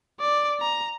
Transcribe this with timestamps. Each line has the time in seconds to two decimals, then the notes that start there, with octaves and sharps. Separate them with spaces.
0.21 D5
0.60 A#5